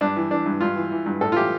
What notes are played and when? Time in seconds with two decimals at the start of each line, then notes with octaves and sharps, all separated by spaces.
0.01 G2 D4
0.16 E3
0.31 E3 D4
0.46 G2
0.61 G2 F4
0.76 E3
0.91 E3
1.06 G2
1.21 A2 A4
1.32 F4
1.36 E3 G4